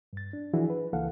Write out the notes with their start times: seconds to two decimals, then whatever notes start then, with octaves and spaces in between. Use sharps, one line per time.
0.13 G2 A6
0.33 D4
0.53 E3 F3 D4 E4 F#4 G#4
0.70 B4
0.93 C#2 E3 A#3 A4 F5 F#5